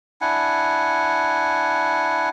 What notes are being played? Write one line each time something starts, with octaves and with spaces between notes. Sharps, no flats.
D4 E4 F#5 G#5